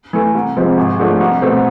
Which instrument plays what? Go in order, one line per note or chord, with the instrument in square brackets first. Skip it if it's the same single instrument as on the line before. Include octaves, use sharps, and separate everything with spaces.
[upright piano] E3 A3
C2
C3 F3 G#3 C4
G#1
G#2 F3 A3 D4
C2
B2 A3 C4